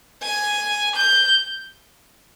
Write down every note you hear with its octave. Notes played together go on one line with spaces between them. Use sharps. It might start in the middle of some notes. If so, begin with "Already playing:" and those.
G#5
G6